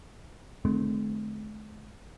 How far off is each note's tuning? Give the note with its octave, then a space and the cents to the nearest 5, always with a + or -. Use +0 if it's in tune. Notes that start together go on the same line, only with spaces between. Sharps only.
D3 +25 G#3 +45 C4 -35